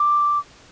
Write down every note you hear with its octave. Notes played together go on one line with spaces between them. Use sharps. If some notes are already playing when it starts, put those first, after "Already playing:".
Already playing: D6